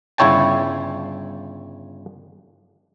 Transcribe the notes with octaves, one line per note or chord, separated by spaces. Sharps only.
G1 C#3 E4 C#5 G5 A5